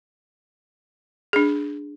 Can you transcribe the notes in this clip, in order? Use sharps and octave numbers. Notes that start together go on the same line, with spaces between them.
D4 G#4